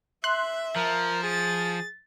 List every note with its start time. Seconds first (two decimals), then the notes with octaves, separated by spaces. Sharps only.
0.24 E5 C6 F#6
0.76 F3 A#4
1.23 G#4 A6